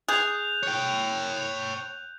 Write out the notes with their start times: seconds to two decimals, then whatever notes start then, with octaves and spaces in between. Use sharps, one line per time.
0.08 G#4 F#6 G6 F7
0.63 C#5 G5